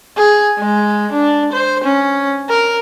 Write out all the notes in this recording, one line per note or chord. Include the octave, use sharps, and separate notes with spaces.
G#4
G#3
D4
C5
C#4
A#4